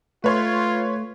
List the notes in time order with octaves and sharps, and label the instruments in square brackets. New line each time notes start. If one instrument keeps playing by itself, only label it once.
[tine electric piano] A3 [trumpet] F4 [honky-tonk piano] B4 C#5 C6